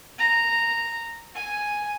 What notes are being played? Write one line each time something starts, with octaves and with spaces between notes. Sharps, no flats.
A#5
G#5